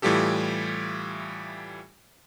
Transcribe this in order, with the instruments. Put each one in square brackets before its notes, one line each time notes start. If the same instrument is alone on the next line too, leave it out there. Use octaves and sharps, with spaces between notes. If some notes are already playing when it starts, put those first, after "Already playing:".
[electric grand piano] A2 E3 G3 F4 G4 A4